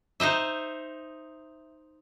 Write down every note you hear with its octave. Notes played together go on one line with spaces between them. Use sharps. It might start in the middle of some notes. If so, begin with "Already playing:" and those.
D#4 C5 D#5 E5